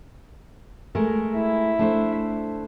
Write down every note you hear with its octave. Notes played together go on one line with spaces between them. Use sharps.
G#3 A3 A#4
E4 E5
A3 D4 C5